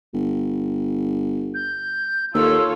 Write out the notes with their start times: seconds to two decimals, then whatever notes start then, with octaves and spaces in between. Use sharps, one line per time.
0.14 G1
1.54 G6
2.34 D#2 F4 A4 C#5 E6